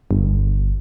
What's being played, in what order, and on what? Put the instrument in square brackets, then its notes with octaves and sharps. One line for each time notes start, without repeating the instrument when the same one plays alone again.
[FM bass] G1